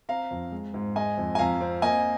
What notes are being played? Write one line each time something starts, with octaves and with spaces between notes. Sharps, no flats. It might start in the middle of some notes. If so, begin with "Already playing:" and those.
C4 F5 A#5
F2
G#3
G#2
G#3 D#5 G#5
F2
G#5
F2 F5 A#5
C4
A#3 D#5 G#5